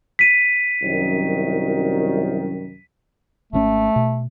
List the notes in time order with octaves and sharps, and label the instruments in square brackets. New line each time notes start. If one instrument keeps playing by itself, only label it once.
[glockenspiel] B6 D#7
[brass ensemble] C2 F#2 D#3
[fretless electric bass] G#1 C3 C#4 [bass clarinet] A3
[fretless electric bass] B2